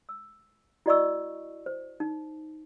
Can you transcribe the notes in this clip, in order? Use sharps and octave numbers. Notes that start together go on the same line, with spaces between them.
E6
E4 F#4 D5 D#5 C#6 E6
C5
D#4